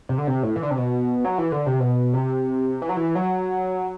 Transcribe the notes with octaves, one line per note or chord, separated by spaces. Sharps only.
C3
D3
C3
A2
E3
D3
C3
B2
F#3
E3
D3
C3
B2
C3
E3
F#3
E3
F#3